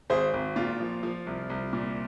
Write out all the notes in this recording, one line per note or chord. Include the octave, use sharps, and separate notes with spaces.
G#1 G#4 C5
G#1
A#2 F4
F3
F3
C2
C2
A#2